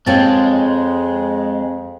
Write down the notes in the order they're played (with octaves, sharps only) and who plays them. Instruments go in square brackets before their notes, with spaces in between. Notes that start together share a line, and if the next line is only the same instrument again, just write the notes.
[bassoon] F2 [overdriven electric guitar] G#3 [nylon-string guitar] C4 F4 C#5 [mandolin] G#4 G5 A5